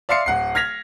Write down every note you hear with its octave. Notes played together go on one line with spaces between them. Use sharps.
D5 E5 F5 C6 C7 C#7
D1 F#5 C7
F6 G#6 A#6 B6 F7